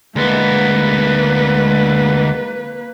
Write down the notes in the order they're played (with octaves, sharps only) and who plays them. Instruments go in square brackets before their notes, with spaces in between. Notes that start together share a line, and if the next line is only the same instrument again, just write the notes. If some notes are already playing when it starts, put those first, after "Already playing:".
[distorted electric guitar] D2 B3 [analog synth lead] G#3 [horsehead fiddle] A#3 B4